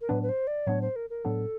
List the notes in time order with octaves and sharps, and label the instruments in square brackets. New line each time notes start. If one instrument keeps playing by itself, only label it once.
[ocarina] A#4
[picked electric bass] A2 F#3 B3 D4 [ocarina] B4
[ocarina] B4
C5
D5
[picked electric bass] A2 F#3 B3 D4 [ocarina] C#5
[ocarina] C5
A#4
A#4
[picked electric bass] A2 F#3 B3 D4 [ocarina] A4